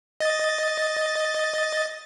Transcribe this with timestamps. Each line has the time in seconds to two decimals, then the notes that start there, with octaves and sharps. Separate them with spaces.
0.20 D#5 A6